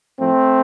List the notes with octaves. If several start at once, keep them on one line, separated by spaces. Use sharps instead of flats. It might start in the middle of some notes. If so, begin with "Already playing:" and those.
A2 F3 A3 C4